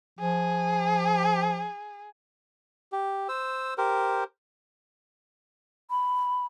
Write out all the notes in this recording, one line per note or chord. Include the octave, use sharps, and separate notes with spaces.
F3 G#4
G4
C5 E6
G4 A#4 C5
B5